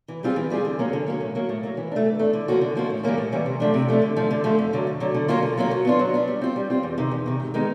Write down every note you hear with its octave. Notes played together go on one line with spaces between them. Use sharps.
E3
G3 C4 F4 G#4
E3
G3 C4 F4 G#4
D3
F#3 A#3 C#4
D3
F#3 A#3 C#4
A2
F#3 A#3
A2
F#3 A#3
E3
A3 D4
E3
A3 D4
D3
F3 A#3 C#4 F#4
D3
F3 A#3 C#4 F#4
A2
E3 G3 A#3 C#4
A2
E3 G3 A#3 C#4
C3
F3 A3 D4
C3
F3 A3 D4
D3
F3 A3
D3
F3 A3
F2
D3 F#3
F2
D3 F#3
D3
F#3 A#3 C#4 F4
D3
F#3 A#3 C#4 F4
F#3
B3 D4 F4
F#3
B3 D4 F4
G3
C4 F4
G3
C4 F4
E2
C3 D#3
E2
C3 D#3
G#2
D#3 G#3 B3 D#4